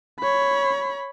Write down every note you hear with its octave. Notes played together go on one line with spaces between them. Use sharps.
C#5 B5